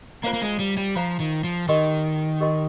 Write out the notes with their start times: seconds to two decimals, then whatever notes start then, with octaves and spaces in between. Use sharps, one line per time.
0.23 A#3 F4 C5 F5 A#5
0.33 A#3
0.42 G#3
0.59 G3
0.77 G3
0.96 F3 F4 C5 F5 A#5
1.20 D#3
1.44 F3
1.68 D#3 G4 A#4 D#5 G5 C6
2.40 G4 A#4 D#5 G5 C6